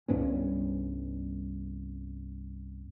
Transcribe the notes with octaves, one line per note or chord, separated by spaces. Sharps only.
C2 G2 B3 C#4